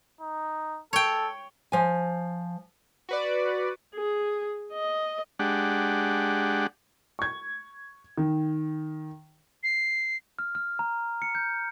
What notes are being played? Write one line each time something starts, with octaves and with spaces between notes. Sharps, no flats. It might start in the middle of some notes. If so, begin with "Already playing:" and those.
D#4
A4 C#5 G5
F3 G#5
F#4 B4 D5
G#4
D#5
G#3 D4 G4 F#5
C#6 G#6
D#3
C7
F6
F6
A#5
C#7
G6